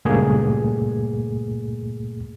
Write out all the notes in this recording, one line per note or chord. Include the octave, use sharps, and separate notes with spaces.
C#2 G2 A#2 A3 A#3 G#4